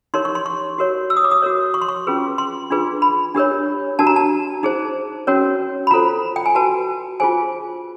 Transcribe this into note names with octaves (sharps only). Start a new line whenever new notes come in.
D#4 G4 A#4 C#5 C6
C#6
C6
C#6
F#4 A#4 C#5
E6
D#6
D6
D#6
F#4 A#4 C#5
C#6
C6
C#6
C#4 F4 G#4 B4
C6
D4 F4 G#4 B4
B5
D4 G4 A#4 C#5
D4 F#4 A#4 A5
A#5
A5
D#4 G#4 C5
C#4 F#4 A#4 C#5
B5
F4 A4 C5 A#5
G5
G#5
F#4 B4 A5
F4 G#4 C5 G#5